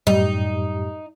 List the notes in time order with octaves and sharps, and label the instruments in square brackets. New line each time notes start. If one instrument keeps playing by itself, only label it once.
[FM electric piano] F#2 A2 G4 [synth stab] G3 [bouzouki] D#4